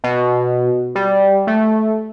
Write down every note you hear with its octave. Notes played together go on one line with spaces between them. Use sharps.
B2
G3
A3